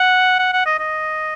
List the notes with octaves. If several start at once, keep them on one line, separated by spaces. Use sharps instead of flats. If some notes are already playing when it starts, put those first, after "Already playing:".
Already playing: F#5
F#5
F#5
D#5
D#5